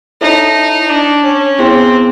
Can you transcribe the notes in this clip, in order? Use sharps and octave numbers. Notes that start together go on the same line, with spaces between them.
D#4 E4 A4 C#5 E5 A5
D4
C#4
B3 C4 E4 G#4